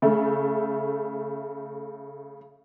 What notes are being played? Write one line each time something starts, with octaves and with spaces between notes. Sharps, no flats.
C#3 A3